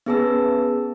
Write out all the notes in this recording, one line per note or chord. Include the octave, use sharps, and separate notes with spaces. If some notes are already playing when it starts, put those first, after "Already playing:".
B3 C#4 G#4 B4 A5 E6